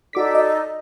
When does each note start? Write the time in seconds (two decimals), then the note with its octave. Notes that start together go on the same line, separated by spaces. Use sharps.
0.13 D#4 F#4 A4 D5 D6 B6
0.35 D#5